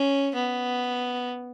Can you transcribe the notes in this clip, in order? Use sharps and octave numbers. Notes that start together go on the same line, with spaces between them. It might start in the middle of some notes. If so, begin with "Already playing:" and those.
Already playing: C#4
B3